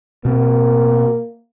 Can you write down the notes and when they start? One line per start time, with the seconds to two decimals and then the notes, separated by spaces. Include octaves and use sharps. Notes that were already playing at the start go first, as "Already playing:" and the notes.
0.25 B2 A#3 C4